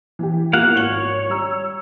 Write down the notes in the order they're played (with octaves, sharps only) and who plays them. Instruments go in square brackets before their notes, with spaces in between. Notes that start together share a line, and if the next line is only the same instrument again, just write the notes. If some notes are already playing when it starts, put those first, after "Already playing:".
[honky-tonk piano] E3 G4
[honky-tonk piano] F3 B3 E4 [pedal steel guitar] A#3 F5 F#5
[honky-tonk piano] G#1 F#7 [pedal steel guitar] C#5
[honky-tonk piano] G3 A#5 E6